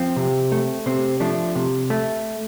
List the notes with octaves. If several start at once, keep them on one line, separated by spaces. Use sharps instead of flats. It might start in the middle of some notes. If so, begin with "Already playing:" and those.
Already playing: F3 C4
C3
A3
C3 C4
F3 A3 D4
C3
A3